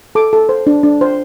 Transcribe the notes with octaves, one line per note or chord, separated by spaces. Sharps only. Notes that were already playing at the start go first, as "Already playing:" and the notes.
A4 D6
A4
C5
D4
D4
C5